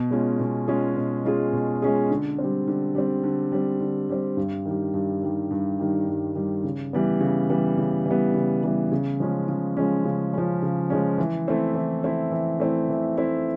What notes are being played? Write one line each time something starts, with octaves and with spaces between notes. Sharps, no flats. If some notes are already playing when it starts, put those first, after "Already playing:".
Already playing: B2
G#3 C#4 F4 G#4
B2
G#3 C#4 F4 G#4
B2
G#3 C#4 F4 G#4
B2
G#3 C#4 F4 G#4
D3
G3 C4
D3
G3 C4
D3
G3 C4
D3
G3 C4
G2
D#3 G3
G2
D#3 G3
G2
D#3 G3
G2
D#3 G3
C#3
E3 G3 B3
C#3
E3 G3 B3
C#3
E3 G3 B3
C#3
E3 G3 B3
C#3
F3 G#3 C#4
C#3
F3 G#3 C#4
C#3
F3 G#3 C#4
C#3
F3 G#3 C#4
E3
A3 C4 E4
E3
A3 C4 E4
E3
A3 C4 E4
E3
A3 C4 E4